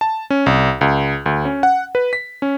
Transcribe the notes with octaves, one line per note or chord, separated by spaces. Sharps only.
A5
C#4
C2
C#2
D2
C#4
F#5
B4
B6
C#4